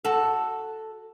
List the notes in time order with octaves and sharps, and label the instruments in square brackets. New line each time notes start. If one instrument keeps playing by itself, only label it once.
[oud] F#4 A4